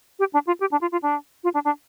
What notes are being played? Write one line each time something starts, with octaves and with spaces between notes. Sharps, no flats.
G4
D4
F4
G4
D4
F4
F4
D4
F4
D4
D4